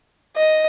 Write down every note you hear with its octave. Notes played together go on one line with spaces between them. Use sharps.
D#5